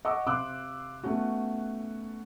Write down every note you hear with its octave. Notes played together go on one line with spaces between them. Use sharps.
D#5 F#5 C#6 D6 E6
C3 F5 C6 D6 E6 F#6
A3 B3 C#4 F#4